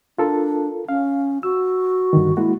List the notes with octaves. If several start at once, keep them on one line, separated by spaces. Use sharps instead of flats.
D4 F4 A4 A#4
C#4 F5
F#4 E6
G2 D3 D#3
G#3 A#3 E4 F#4